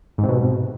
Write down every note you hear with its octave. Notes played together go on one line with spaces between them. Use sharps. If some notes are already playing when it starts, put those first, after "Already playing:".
G#2
C3
B2